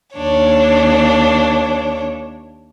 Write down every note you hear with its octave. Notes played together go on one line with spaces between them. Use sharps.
D#2 D4 C#5